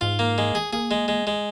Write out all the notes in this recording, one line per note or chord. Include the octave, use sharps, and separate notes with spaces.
G#2 F4
A#3
G#3
G#4
A#3 G#4
G#3
G#3
G#3